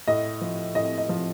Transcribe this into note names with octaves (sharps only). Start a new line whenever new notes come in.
A2 D#5
F3
A2 D#5
D#5
F3